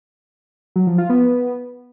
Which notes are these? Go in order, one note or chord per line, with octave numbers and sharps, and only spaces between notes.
F#3
F3
F4
B3